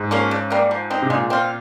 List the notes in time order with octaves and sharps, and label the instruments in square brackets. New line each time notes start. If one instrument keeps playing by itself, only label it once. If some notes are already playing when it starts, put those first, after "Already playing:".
Already playing: [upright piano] G#2
[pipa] F3 A#3 C#4
C#3
G3 A#3
F3
C4 D#4
[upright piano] C3
[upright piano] A#2 [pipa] G#3
[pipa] C4 F4